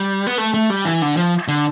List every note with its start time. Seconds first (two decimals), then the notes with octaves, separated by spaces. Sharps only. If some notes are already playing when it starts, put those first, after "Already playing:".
Already playing: G3
0.27 B3
0.38 A3
0.54 A3
0.70 G3
0.85 E3
1.02 D3
1.17 F3
1.48 D3